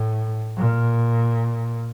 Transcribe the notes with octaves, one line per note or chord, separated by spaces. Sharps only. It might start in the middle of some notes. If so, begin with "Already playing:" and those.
Already playing: A2
A#2